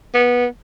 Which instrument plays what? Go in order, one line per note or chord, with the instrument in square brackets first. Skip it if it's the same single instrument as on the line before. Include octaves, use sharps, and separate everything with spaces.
[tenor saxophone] B3